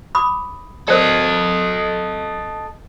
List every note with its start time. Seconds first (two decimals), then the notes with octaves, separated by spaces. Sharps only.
0.15 B5 D6 D#6
0.88 A4 A#4 C5 D5 D#5